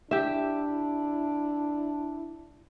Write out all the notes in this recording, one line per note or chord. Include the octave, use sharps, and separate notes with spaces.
D4 E4 G4 E5